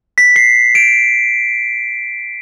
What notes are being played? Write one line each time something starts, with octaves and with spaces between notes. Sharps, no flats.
B6
C7
D7